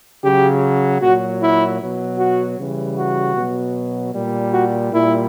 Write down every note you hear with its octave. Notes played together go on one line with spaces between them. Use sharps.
C#3 F#3 G4
A#2 F#3 F#4
E4
B2 F#3
F#4
C#3 E3 G3
F#4
B2 F#3
A#2 G3
F#4
A#2 G3 E4